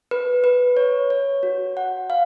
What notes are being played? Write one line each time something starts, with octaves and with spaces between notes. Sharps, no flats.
B4
B4
C#5
C#5
F#4
F#5
F5